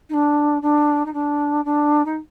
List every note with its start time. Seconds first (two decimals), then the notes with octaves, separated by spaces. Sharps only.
0.09 D#4
0.13 D4
0.62 D4
1.05 D#4
1.13 D4
1.65 D4
2.05 D#4